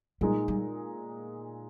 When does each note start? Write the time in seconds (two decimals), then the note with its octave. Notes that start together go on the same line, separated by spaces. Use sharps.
0.21 A#2 G3 G#3 D#4
0.48 G3